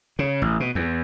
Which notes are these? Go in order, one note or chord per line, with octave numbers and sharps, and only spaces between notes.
C#3
A1
B2
E2